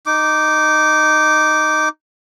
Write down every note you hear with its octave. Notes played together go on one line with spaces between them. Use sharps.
D#4 D6